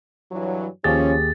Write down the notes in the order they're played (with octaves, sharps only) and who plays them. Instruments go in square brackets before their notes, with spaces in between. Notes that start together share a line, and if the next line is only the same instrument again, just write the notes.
[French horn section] G2 E3 F#3
[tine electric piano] D#2 G4 G#4 [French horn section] F3 C#4 [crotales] A6